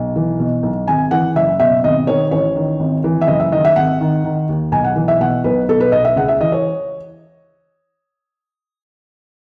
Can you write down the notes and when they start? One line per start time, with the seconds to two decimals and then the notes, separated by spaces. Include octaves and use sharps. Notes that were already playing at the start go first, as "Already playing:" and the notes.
Already playing: B1
0.16 E3
0.39 B2
0.63 B1
0.88 G#1 G#5
1.11 E3 F#5
1.35 F#1 E5
1.60 B2 E5
1.84 G#1 D#5
2.07 D#3 C#5
2.31 A1 C#5
2.56 D#3
2.80 G#1
3.04 E3
3.21 E5
3.27 F#1 D#5
3.40 E5
3.52 D#3 D#5
3.65 E5
3.76 G#1 F#5
4.01 D#3
4.24 D#3
4.49 D#2
4.72 B1 G#5
4.84 F#5
4.96 E3
5.08 E5
5.20 B2 F#5
5.44 B1 B4
5.69 B2 A4
5.80 B4
5.92 B1 D#5
6.05 E5
6.16 C#2 F#5
6.28 E5
6.41 E3 D#5
6.52 C#5